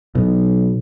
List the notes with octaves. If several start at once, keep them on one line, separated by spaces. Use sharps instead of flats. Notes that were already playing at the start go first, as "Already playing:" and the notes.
B1 B2